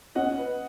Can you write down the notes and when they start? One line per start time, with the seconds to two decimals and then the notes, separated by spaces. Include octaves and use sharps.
0.15 C#4 D#5 F#5
0.38 B4